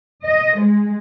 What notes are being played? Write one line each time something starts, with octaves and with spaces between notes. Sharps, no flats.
D#5
G#3